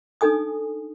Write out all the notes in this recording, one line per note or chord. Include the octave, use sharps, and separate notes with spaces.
D4 D#4 A4 G#5 D#6